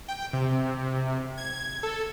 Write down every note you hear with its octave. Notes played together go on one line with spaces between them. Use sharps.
G5
C3
G#6
A4